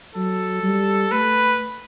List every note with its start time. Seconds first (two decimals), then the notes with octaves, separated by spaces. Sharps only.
0.15 F#3 A4
0.63 G3
1.11 A3 B4